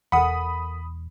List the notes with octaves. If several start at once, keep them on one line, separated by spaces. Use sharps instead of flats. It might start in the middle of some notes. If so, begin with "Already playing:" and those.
E1 A4 A#4 F#5 B5 D#6